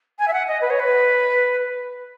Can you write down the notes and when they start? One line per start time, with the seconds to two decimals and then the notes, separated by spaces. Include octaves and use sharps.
0.19 G#5
0.28 E5
0.33 F#5
0.48 D#5
0.61 B4
0.70 C#5
0.80 B4